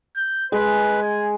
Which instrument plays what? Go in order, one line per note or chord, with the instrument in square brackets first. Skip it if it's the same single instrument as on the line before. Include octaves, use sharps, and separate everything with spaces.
[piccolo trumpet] G6
[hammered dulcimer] G#3 [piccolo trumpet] B4
[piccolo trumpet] G#5